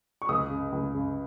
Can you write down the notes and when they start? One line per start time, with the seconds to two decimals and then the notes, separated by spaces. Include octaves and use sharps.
0.22 C#6
0.29 C#2 D#6
0.50 C#3
0.72 C#2
0.94 C#3